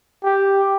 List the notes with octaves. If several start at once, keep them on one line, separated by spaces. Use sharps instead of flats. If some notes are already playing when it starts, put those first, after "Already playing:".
G4